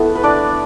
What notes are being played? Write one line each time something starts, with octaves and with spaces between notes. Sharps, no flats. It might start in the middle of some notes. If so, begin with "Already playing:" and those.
Already playing: A3 B3 E4 A4 E5
B4
D4 D5